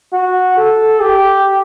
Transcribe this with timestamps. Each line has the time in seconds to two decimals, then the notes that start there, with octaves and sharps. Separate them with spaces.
0.13 F#4
0.57 A4
1.00 G4